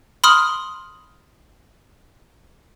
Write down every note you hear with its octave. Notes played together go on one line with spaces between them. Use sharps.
B5 C6 D#6 F6